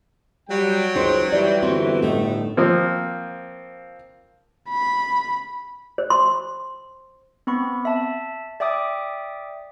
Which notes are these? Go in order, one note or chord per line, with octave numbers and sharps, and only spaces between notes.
F#3 G3 G5
C#2 D#4 C5
E3 G3 D5
G1 C4 F#4
A2 A3 D#4
F3 A#3 C4 F4
B5
C5
C6
B3 C4 B5 C#6
E5 A5
D5 E5 G5 D6 D#6